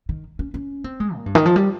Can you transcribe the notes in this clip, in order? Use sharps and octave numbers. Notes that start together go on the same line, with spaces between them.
D#3
C#4
C#4
C4
G#3
A#2
G2
D#3
F3
G3